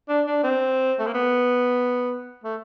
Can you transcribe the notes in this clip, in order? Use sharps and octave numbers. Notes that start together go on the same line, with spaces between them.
D4
D4
C4
A3
A#3
B3
A3